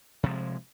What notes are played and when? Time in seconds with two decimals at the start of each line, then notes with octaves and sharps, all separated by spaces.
0.23 C3
0.26 F3
0.29 G#3